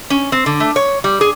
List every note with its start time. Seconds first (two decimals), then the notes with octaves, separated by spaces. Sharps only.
0.10 C#4
0.32 C4
0.46 D3
0.60 A3
0.76 C#5
1.04 G3
1.21 G#4